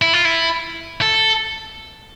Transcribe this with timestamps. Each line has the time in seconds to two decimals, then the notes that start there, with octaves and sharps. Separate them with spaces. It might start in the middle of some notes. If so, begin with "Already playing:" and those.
0.02 E4
0.13 F4
0.25 E4
1.02 A4